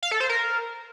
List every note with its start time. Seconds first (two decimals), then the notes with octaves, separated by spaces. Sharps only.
0.03 F5
0.11 A4
0.20 C5
0.29 A#4